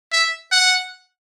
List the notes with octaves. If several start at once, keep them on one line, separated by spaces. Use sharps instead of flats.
E5
F#5